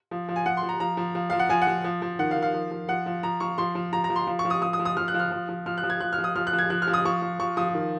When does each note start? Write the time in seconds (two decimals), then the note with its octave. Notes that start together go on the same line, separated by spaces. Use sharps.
0.11 F3
0.29 F3
0.36 G#5
0.46 F3 F#5
0.57 C6
0.63 F3
0.69 A#5
0.80 F3 A#5
0.97 F3
1.15 F3
1.30 F3 F5
1.39 F#5
1.49 F3 G#5
1.62 F#5
1.67 F3
1.84 F3
2.02 F3
2.19 D#3 F#5
2.31 F5
2.36 D#3
2.42 F5
2.54 F3
2.71 F3
2.88 F3 F#5
3.06 F3
3.23 F3 A#5
3.40 F3 C#6
3.58 F3 C6
3.75 F3
3.93 F3 A#5
4.04 A#5
4.10 F3
4.16 C6
4.27 F3
4.39 C#6
4.45 F3
4.50 D#6
4.62 F3 D#6
4.73 D#6
4.79 F3
4.85 D#6
4.97 F3 F6
5.08 F#6
5.14 F3
5.20 F6
5.32 F3
5.49 F3
5.66 F3 F6
5.78 F#6
5.83 F3
5.90 G#6
6.00 F3 F#6
6.13 F6
6.18 F3
6.24 D#6
6.36 F3 F6
6.47 F#6
6.53 F3
6.59 G#6
6.70 F3 F#6
6.82 F6
6.87 F3
6.94 D#6
7.05 F3 C#6
7.22 F3
7.39 F3 C#6
7.57 F3 D#6
7.74 D#3